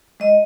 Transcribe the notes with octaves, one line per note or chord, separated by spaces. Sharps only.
G#3 D#5